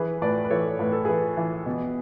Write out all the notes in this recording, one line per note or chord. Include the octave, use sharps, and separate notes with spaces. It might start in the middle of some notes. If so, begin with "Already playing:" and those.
Already playing: E3 G#4 B4
A2 B4 D5
B4
E3 A4 C#5
A2 B4
A4
E3 G#4 B4
E3
B2